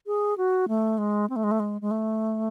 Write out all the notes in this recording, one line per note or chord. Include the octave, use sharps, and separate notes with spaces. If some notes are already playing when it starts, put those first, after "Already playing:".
G#4
F#4
A3
G#3
C4
A3
G#3
A3
G#3
G#3
A3